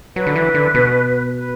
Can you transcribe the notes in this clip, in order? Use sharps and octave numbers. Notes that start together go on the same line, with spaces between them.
F#3 B4
D3
E3
D3
B2
B4